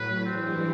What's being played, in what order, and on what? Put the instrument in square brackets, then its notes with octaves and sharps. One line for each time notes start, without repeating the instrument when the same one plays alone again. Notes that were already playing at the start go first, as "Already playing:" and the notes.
Already playing: [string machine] A2 F#3 [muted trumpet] B4
[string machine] G2 E3 G3 [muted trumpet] C4